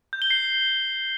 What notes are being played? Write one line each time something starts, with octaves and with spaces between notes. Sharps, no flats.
G6
G7
C7